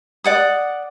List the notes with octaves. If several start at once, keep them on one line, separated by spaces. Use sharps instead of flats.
D5 F#5 D#6